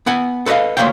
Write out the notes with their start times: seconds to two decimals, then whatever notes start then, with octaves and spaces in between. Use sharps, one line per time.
0.06 B3 F#5 G#5
0.46 A4 B4 C#5 D#5 F5
0.77 D2 A#2 A3 C#5 F5 G5